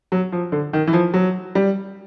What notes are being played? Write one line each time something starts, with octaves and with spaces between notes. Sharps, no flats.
F#3
F3
D3
D#3
E3
F3
F#3
G3